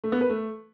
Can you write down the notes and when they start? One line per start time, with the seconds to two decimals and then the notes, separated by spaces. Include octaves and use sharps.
0.04 A3
0.12 B3
0.21 B4
0.30 A3